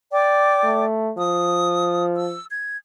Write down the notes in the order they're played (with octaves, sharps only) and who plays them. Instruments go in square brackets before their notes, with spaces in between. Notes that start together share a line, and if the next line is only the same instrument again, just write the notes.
[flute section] D5 G5 D6
[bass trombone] A3
[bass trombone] F3 [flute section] D#6
[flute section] E6
G#6